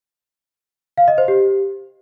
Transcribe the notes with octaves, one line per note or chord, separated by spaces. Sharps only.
F5
D#5
C5
G4